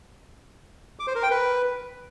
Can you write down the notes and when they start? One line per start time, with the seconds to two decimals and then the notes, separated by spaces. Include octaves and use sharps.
0.99 D6
1.07 C5
1.15 A#4
1.23 G5
1.31 B4